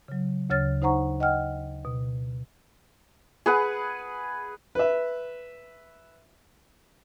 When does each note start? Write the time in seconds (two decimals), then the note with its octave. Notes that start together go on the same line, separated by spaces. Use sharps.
0.08 C#3 F#3
0.50 D2 C#3 C#5 F6 A6
0.82 D#4 C5 F#5 A#5 C#6
1.20 D#5 F#5 G5 F6
1.85 B2
3.46 G#4 B4 F#5
4.75 B4 E5